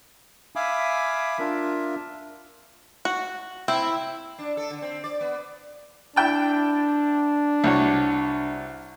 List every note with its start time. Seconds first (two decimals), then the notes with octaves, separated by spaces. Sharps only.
0.56 E5 F5 G#5 B5 D6 D#6
1.39 D4 F4 A#4 E5
3.05 F#4
3.68 C4 E4
4.39 D4
4.57 A4
4.71 D3
4.82 C4
5.04 D5
5.21 B3
6.16 D4 E4 G5 A5
7.64 C2 F#4 C#5